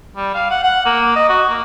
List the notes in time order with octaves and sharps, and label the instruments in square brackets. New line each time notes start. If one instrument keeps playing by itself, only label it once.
[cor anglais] G3
F5
F#5
F#5
A#3
D#5
F#4
A#3